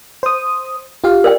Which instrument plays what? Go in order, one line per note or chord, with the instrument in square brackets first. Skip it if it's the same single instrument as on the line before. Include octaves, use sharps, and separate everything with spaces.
[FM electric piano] C5 D#6
F4 G4 F5
[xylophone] A#4 D5 G5